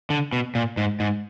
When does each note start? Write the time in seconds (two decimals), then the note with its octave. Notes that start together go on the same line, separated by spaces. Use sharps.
0.10 D3
0.33 B2
0.55 A#2
0.77 G#2
1.00 G#2